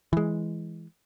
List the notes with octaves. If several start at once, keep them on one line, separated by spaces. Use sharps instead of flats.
E3 G#3